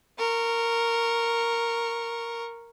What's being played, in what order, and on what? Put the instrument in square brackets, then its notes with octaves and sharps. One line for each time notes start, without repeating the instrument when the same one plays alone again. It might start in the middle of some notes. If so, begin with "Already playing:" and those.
[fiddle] A#4 C#6